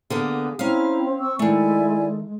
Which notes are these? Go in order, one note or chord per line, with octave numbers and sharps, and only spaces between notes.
D3 A#3 B3 G#4
C4 C#4 E4 F5 A#5
C#6 E6
D#3 G#3 A3 E4 D5 G#5